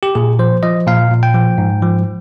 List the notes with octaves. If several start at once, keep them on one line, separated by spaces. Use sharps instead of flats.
G4
A#2 G#4
F3 C5
F3 D#5
A#2 F5
A#2
G5
F3
G#2
F3